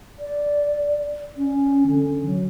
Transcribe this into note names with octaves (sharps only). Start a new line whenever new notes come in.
D5
C#4
D3
F#3